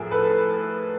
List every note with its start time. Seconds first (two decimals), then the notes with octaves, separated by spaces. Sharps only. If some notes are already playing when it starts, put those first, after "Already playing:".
Already playing: A2 F3 G#4 A#4
0.11 A4 B4